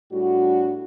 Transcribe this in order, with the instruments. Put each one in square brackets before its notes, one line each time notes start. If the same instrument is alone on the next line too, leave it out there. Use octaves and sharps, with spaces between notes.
[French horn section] A2 G3 D4 F#4